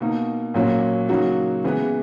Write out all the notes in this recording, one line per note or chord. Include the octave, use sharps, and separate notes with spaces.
B2 A#3 D#4
A#2 F#3 A#3 C#4 F#4
C#3 F#3 A#3 D#4 F#4
C#3 E3 G#3 B3